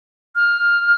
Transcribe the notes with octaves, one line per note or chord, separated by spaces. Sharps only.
F6